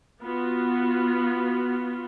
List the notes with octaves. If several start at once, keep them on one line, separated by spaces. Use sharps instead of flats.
B3 F4 F#4